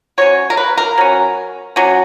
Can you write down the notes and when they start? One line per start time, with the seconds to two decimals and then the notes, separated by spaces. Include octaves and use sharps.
0.18 F#3 C#4 C#5
0.50 A#4
0.57 B4
0.77 A#4
0.98 F#3 C#4
1.76 F#3 C#4